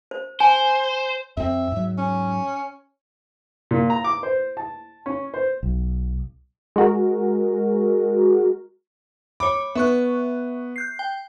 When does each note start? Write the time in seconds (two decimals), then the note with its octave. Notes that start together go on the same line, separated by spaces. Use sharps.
0.11 C5
0.40 C5 G#5
1.37 F2 C4 E5
1.72 G#2 F#3
1.98 C#4
3.71 A#2
3.90 A#5
4.04 D6
4.23 C5
4.57 A5
5.06 C#4
5.34 C5
5.63 B1
6.76 G#3 F#4 A#4
9.40 C#5 B5 D6
9.75 B3 E5 C#6 F#6
10.76 F#6 G6 C7
10.99 G5